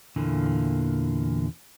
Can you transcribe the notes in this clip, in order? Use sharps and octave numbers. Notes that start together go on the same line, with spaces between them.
E2 A#2 D3 E3 A#3